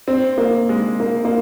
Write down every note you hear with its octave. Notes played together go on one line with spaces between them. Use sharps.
C4
A#3
G#3
A#3
A#3